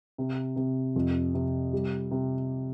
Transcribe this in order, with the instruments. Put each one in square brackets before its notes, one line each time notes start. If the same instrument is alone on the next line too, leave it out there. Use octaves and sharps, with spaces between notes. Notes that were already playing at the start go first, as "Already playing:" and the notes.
[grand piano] C3
C3
F2
C3
G3
C3